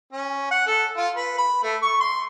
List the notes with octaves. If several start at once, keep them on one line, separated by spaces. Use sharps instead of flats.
C#4
F#5
A4
F4
B4
B5
A3
C#6
C6